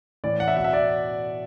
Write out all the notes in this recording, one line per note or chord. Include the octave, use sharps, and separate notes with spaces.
A2 E3 D5
F#5
E5
B2 F#5
E5
D5